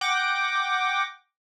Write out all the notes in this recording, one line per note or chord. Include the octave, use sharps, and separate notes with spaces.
F#5 G5 D6 A#6